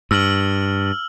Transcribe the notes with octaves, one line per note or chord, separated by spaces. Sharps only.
G2 E6 F6 F#7